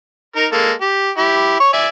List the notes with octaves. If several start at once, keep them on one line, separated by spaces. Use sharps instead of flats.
D#4 A#4
G#3 A#3 A4
G4
E4 G4
C#5 C#6
D5 E5 G#5